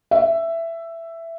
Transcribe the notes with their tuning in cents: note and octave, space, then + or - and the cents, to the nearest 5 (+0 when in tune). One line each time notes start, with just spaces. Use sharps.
E5 +10